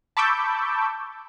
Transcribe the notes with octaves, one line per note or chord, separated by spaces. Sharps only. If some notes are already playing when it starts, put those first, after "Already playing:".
A5 B5 C#6 D6 E6 G6